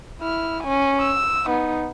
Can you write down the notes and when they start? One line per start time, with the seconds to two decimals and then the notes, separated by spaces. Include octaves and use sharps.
0.22 E4 F6
0.63 C#4 G#5
1.02 E6
1.46 B3 D#4